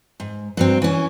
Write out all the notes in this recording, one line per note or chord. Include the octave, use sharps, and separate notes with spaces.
G#2
G2 F#3 C4
E3 C#4